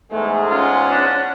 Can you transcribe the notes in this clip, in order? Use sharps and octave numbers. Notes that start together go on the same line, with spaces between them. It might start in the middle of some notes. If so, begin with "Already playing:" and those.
E2 G#2 G#3 A3
C#4 F4 F#5
D4